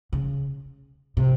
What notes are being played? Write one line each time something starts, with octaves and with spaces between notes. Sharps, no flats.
C#3
C3